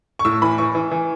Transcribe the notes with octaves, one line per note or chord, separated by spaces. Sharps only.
C#6
A2 E6
E3 B5
E3 C#6
E3
E3